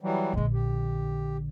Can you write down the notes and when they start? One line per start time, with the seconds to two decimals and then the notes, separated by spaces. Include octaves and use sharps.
0.01 E3 F#3 G3
0.33 A#1 D3 G#3
0.53 G4